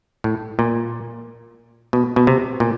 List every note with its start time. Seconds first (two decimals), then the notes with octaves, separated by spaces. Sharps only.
0.24 A2
0.59 A#2
1.93 B2
2.16 B2
2.27 C3
2.60 A#2